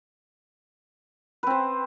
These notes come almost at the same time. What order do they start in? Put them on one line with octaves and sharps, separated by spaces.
B4 C4 C5